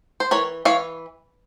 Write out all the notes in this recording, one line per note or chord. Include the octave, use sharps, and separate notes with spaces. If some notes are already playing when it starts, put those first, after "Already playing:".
C5
E3 A#4 C#5
E3 C#5 F5